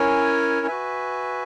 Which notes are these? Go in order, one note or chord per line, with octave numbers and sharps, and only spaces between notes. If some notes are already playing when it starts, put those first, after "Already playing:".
Already playing: C#4 E4 A#4 C#5 G#5
F#4 B4 E5 G#5